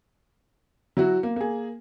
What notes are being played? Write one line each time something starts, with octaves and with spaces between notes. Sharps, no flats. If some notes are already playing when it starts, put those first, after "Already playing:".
F#3 E4 F#4
A#3
A#3 G#4